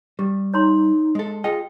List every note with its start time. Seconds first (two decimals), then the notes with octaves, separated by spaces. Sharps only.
0.19 G3 G4
0.54 D#4 C#5 A#5 C6
1.15 G#3 A4
1.44 F4 G#4 D#5 G5